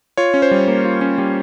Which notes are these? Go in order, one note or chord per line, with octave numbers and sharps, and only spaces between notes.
F4 C#5
C#4
C5
G3
A#3
F4
C#4
G3